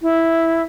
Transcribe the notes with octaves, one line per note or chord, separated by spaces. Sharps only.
E4